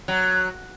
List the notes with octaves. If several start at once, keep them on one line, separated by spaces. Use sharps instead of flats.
F#3